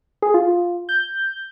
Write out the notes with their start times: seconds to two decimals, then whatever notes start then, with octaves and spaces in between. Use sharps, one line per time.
0.22 G#4
0.34 F4
0.89 G6